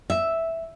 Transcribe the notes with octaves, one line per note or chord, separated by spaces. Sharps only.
E5